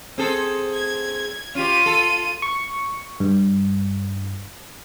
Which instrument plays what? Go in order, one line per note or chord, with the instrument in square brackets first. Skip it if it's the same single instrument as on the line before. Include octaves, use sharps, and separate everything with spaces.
[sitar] C4 G#4 A4
[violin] G#6
[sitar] C#4 G4 [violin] F4 D#7
[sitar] A4
[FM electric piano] C#6
G2